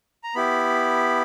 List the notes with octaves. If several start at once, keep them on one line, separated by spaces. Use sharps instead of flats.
A#5
B3 E4 G4 B5